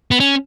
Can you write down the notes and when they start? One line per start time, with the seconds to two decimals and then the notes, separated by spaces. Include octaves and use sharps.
0.11 B3
0.20 C#4